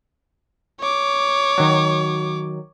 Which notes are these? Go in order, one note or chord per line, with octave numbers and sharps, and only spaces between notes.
C#5 D6
D#3 F#3